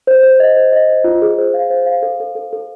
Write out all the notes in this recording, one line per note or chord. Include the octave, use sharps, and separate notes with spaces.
C5
C5
D#5
C5
D#5
C5
F4
G#4
C5
F5
C5
F5
A4
A4
A4
A4